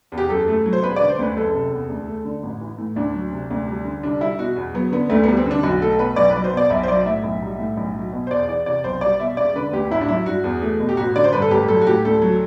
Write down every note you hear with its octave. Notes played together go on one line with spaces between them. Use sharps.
E2
G4
F#2 A4
A3
F#3
C5
E1 B4
D3 D5
C5
D2 B4
F#1 A4
C3
E2
D2
A3
D3
A1
E3
A2
D2 D4
F#3
C3
D2
G3
D3
C2 D4
G3 E4
B2 F#4
E2
F#3 B3
D3 B3
D2 A3
G3 B3
C4
D3
D4
B1 F#4
A3 A4
B2 B4
B1 D5
F#3 B4
C5
B2 D5
B1 E5
C5
F#3 D5
A2 E5
B1
G3
A2
B1
F#3
B2
C5
E2 D5
E3 D5
C3 D5
B1 C5
G3 D5
B2 E5
E1 D5
D3 B4
D2 G4
A1 E4
D4
F#3 E4
G2 F#4
E2
A3
B2
G4
A1 F#4
D3 D5
C5
G2 B4
A4
A1 G4
F#3 A4
F#4
A2 G4
D2 A4
F#3